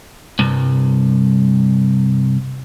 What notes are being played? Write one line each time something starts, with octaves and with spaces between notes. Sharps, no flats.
C2 G2